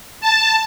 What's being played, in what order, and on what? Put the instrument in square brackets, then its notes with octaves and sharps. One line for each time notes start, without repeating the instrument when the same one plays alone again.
[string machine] A5